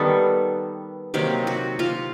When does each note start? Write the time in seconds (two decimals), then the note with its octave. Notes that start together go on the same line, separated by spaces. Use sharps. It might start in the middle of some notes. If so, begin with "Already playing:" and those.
Already playing: D#3 G3 B3 A4
1.14 C3 D#3 F#3 A#3 G4
1.47 F#4
1.79 F4